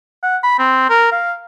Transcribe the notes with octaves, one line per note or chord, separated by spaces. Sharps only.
F#5
B5
C4
A#4
F5